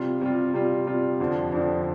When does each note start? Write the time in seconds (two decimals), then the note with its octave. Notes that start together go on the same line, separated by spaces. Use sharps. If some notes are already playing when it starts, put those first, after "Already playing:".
Already playing: C3 G3 F4
0.21 C3 G3 F4
0.54 C3 G3 F4
0.87 C3 G3 F4
1.20 F2 D3 F3 D4
1.52 F2 D3 F3 D4